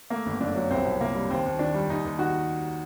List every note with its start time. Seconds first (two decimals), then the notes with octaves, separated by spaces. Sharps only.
0.10 A3 A#3
0.26 G1
0.40 F#2 D4
0.55 F#3
0.70 C2 C4
0.85 C2
1.01 C3 A#3
1.15 G3
1.30 D#2 C4
1.45 D#2
1.59 D#3 D4
1.74 G3
1.90 D#2 D#4
2.05 D#2
2.19 D#3 F#4